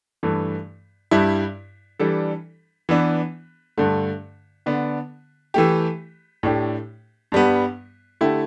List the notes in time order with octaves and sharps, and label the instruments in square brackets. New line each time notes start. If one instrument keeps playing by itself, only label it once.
[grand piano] G2 E3 A3
G2 G3 E4
E3 G3 D4 A4
E3 B3 D4
G2 D3 A3
D3 B3 D4
E3 A3 G4
A2 A3 D4 G4
G2 G3 B3
D3 A3 E4 G4